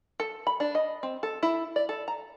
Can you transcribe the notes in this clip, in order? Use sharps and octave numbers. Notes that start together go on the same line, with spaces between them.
A4
B5
D4
D#5
C4
A4
E4
D5
A4
A#5